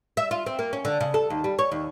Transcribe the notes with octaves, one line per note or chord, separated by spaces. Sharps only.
E5
F4
C4
A#3
C#4
D3
C#3
A4
D#2
G3
C#5
D#2